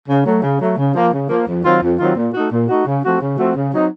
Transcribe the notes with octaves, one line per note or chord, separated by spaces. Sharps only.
C#3
F#3 A3
C#3
F#3 A3
C#3
F3 A#3
C#3
F3 A#3
F2
D#3 F#3 C4 F4
F2
D#3 F#3 C4 F4
A#2
A3 D#4 F#4
A#2
A3 D#4 F#4
C#3
F3 A3 C4 F#4
C#3
F3 A3 C4 F#4
C#3
F#3 C4 D#4